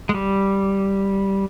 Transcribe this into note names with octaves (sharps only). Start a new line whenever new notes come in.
G#3
G3